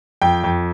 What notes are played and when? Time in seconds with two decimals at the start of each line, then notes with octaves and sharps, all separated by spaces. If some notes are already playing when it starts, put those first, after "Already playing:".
0.22 F2 G5
0.44 F2